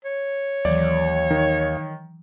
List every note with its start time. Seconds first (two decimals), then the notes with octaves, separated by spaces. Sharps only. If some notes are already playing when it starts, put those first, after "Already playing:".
0.05 C#5
0.65 D#2 E3 F#3 D5
1.30 D#3